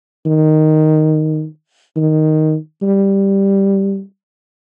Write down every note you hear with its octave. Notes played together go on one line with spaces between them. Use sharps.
D#3
D#3
G3